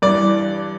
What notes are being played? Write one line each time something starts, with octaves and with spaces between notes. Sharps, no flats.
G2 E3 D5